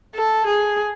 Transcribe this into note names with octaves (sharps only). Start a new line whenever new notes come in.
A4
G#4